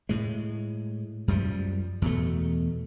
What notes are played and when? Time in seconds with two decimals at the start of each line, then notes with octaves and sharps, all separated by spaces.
0.09 A2 G#3
1.28 F#2 F3 G3
2.02 E2 B2 A3